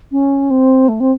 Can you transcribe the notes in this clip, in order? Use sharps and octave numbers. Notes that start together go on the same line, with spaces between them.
C#4
C4
A3
C4